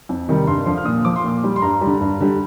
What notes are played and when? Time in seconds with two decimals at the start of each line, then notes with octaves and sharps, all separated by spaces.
0.09 F2
0.28 C3 D#3 G3
0.47 G2 C6
0.66 D3 F3 C6
0.78 F6
0.85 A#2 D#6
1.05 F3 D6
1.16 C6
1.24 A#2 D6
1.44 G3
1.56 C6
1.62 G2 A#5
1.81 G3
1.87 D3
2.01 G2
2.20 D3 G3